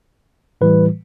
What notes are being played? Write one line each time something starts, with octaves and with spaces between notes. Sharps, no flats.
A2 E3 G3 B4